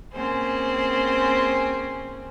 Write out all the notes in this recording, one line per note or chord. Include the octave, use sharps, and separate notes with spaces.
A#3 C4 C#4 G#4 C5